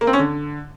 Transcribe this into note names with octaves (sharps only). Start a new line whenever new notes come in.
A#3
C4
C#4
D3